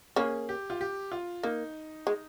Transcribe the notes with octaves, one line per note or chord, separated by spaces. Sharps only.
A#3 C#4 G#4
G4
F4
G4
F4
A#3 D#4
G#3